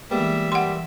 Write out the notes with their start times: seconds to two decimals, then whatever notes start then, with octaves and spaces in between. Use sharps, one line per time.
0.11 E3 G3 G#3 A#3 B3 E5
0.52 G3 F#5 C6